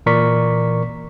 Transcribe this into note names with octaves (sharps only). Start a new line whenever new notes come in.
A#2 E3 A#4 D5 C#6 B6